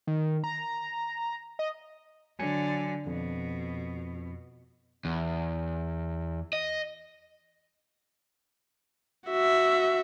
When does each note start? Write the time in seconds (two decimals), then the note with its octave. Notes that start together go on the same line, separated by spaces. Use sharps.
0.07 D#3
0.44 A#5
1.59 D#5
2.39 D3 F#3 G#5 C#7
3.06 F2 B2
5.05 E2
6.53 D#5
9.28 F#4 E5